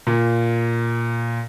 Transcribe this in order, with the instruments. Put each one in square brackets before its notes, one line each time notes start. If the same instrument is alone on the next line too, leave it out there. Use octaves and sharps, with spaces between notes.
[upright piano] A#2